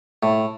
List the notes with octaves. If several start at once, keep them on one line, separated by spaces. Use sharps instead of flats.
A2